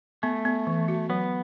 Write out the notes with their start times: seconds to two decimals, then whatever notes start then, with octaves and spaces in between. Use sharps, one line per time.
0.23 A3 B3
0.45 B3
0.67 E3
0.88 F#4
1.10 F#3 B3